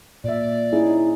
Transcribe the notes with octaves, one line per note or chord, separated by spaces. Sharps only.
A#2 D5 E5
C#4 D#4 E4 G#4